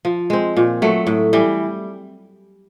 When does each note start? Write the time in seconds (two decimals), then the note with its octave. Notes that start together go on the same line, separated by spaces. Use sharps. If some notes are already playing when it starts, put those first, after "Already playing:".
0.05 F3
0.30 G#3 C4
0.57 A#2
0.82 F#3 A3
1.07 A2
1.33 E3 G3